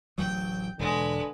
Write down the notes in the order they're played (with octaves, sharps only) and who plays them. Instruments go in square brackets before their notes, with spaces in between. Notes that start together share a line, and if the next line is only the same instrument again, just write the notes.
[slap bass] D1 A1 F#3 [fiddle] G5
[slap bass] E1 [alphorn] D3 [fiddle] G#3 B4